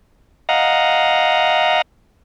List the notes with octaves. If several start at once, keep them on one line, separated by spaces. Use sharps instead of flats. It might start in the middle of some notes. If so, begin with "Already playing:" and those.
D#5 F5 F#5 A#5